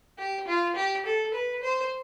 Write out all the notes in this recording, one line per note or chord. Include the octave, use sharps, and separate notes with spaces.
G4
F4
G4
A4
B4
C5